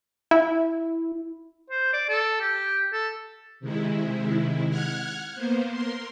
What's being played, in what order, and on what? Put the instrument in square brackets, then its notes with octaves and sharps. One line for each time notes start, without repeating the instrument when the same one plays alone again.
[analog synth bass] E4
[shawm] C5
D5
A4
G4
A4
[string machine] C3 D#3 G#3 E4
F#5 F6 F#6 G#6
A#3 B3 C5
A#4 C6